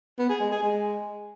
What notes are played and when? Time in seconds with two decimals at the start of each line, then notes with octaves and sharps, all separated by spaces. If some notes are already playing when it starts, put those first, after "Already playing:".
0.18 B3
0.29 G#4
0.40 G#3
0.51 G#4
0.62 G#3